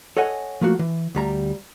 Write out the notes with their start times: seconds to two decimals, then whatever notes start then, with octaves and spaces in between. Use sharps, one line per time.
0.17 A4 C#5 D#5 F#5 G#5
0.61 F3 A3 A#3 F#4
0.79 E3
1.15 D2 G3 A#5